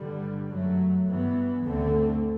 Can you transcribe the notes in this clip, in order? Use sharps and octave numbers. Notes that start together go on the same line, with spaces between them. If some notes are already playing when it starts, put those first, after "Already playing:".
Already playing: G2 D3 G3
F#2 F#3 A3
G2 E3 B3
D2 D3 A3 C4